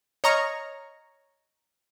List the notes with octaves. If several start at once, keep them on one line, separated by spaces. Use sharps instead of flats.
C#5 D#5 A#5 C#6 F6